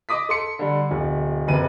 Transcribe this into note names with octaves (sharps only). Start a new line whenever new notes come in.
D#5 D6 D#6 B6
A4 C6 C#7
D3 G3
D1 B2
F#1 C3 B4 D#7